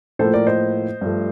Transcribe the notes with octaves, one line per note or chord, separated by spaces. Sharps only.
A2 F3 A#3 A4 C5
A#4 D5
C5 D#5
G2 F3 A3